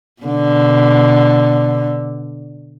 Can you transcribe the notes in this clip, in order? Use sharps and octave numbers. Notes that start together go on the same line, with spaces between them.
B2 D3